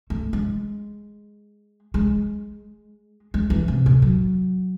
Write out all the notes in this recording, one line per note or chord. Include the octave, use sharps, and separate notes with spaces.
A3
G#3
G#3
G#3
E3
C3
A2
F#3